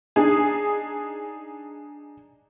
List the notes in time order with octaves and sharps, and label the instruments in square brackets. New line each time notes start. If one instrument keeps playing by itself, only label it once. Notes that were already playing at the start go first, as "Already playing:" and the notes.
[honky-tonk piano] D4 D#4 G#4